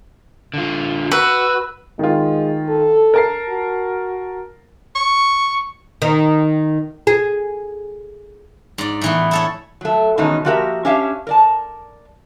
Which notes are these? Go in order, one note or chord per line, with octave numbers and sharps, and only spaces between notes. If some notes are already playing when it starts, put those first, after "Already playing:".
D3 F4
F#4 B4 E6
D#3 G#3 F4
A4
A#4 A5 C7
F#4
C#6
D#3
G#4
G#2 D5
A2 E3 B3
E4 A4 C#5
F#3 A3
B2 D#3 E3 G#3 C#4 D#4
F3 A#3 F#4 G4 A#4 E5
C#4 D4 G4 C#5 E5 F5
A#4 D5 A5